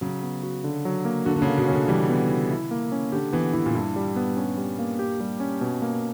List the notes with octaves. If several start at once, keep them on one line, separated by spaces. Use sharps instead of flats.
C#3 F#3
B3
F#4
D3
F#3
A#3
D3 F#4
D3
C#3
A#3
B2
D3 C#4
E3 G3
B3
E4
E4
A#3
C#4
D3 G4
E3 B3
E3 E4
A#2
G2 E4
G3
B3
C#4
G3
A#3
G4
G3
C#4
B2
A#3